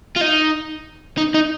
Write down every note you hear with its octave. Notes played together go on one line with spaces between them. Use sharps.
F4
D#4
D#4
D#4